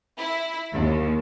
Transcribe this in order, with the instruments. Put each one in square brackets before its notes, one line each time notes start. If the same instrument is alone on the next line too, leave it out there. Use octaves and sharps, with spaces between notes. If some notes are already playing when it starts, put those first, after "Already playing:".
[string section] E4
D#2